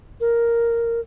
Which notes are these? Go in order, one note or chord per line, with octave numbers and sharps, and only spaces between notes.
A#4